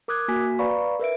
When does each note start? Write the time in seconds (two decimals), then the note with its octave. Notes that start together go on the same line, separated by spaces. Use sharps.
0.08 A#4 D6 D#6 F#6 G#6
0.28 A#3 F#4 G#5 B6
0.59 B4 D5 F5 A#5 B5 C#6
0.99 A#4 B4 E5 D7